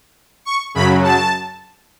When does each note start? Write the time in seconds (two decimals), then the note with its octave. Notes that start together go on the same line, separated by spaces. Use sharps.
0.45 C#6
0.75 F#2 C#3 F#3 B5
1.04 A5